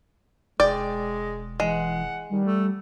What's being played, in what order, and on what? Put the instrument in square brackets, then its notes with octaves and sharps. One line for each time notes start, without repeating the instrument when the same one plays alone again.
[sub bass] E1 [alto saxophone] G#3 [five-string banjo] D5 G5
[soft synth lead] E3 [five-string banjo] G#3 [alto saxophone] F#5
[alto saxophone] D#3 [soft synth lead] G3
[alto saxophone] A3